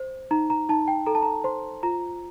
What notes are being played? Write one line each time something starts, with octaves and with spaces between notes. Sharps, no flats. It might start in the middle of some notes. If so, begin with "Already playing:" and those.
Already playing: C5
D#4 A#5
A#5
D#4 A5
G5
A4 A#5
A5
A#5
C5 C6
F4 A#5